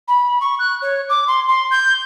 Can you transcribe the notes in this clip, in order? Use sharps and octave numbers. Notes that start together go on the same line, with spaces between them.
B5
C#6
F#6
C#5
D6
C6
C6
G6